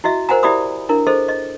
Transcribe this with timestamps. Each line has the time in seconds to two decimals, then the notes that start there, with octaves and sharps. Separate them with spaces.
0.04 E4 F#4 D#5 E5
0.29 A#4 C5 F#5 G#5 A#5
0.43 E4 G4 D5 E5 B5 D#6
0.89 D4 E4 A#4
1.07 G#4 A4 C5 D#5
1.29 D#5